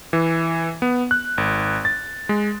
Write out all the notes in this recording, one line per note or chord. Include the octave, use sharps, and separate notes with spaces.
E3
B3
F#6
G#1
A6
G#3